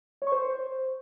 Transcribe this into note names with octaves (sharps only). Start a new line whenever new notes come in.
C#5
C#6
C5